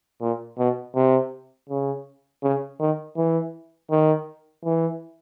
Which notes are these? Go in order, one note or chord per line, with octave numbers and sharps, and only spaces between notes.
A#2
B2
C3
C#3
C#3
D#3
E3
D#3
E3